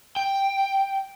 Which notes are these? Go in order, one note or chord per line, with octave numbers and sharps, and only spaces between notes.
G5